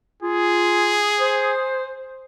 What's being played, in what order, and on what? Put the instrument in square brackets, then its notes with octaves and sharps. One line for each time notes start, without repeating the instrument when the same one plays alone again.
[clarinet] F4 [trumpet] G#4
[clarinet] C5